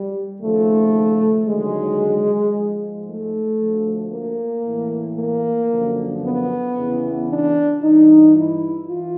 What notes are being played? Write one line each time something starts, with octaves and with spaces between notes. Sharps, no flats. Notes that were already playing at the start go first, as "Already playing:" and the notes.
Already playing: G3
D#2 C#3 F3 A3
D#2 D3 F#3 G#3
G#2 F3
A3
D2 D3 F3
A#3
A2 E3
A#3
F#2 D3 F3
B3
E2 C#3 E3
D4
G2 E3 D#4
E4
E3 F4